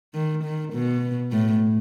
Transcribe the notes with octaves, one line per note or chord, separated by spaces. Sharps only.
D#3
D#3
B2
A2